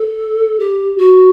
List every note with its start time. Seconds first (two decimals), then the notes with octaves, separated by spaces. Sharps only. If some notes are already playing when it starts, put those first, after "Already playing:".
Already playing: A4
0.60 G4
0.98 F#4